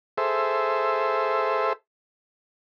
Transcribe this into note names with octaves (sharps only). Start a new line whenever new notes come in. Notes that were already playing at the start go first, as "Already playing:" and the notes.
G#4 A4 C5 E5